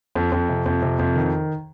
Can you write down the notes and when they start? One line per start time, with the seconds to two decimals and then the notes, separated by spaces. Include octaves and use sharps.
0.16 F2
0.32 F2
0.49 C3
0.66 F2
0.82 C3
0.99 F2
1.16 D#3